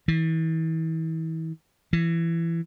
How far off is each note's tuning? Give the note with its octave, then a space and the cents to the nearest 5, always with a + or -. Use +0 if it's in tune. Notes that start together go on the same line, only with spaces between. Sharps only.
E3 -35
E3 +20